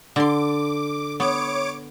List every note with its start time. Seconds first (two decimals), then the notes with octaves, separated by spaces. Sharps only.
0.16 D3 C6 D6
1.20 B3 C#5 D6 D7